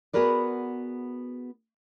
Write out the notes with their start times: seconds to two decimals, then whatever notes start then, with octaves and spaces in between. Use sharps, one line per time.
0.13 B3 F#4 G#4 A#4 B4 D5